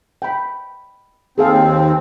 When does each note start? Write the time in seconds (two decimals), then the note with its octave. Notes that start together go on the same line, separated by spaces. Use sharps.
0.22 G5 B5
1.38 D#2 C4 G#4 A4 F5